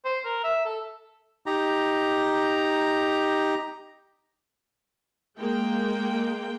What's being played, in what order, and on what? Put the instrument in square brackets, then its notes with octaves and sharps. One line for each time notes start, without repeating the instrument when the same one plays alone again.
[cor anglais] C5
A#4
E5
A4
[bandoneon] D#4 G4 A#5
[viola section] G#3 A#3 G5